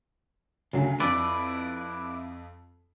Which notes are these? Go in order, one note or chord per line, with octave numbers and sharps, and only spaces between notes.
D2 C#3 F#3
F2 F3 E4 B4 D5